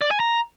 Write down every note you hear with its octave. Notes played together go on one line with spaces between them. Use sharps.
D5
G#5
A#5